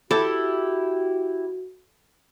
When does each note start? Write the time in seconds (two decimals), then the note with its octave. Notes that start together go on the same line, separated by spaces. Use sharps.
0.11 E4 F#4 G4 A4